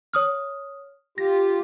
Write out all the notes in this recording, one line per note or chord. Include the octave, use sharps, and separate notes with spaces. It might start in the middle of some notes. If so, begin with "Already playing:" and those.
C#5 D#6 F6
F4 G4 A#6